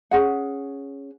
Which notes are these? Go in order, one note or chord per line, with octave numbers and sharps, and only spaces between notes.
C#4 G#4 F#5